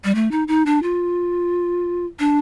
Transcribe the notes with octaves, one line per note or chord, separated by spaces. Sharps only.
G3
A3
D#4
D#4
D4
F4
D4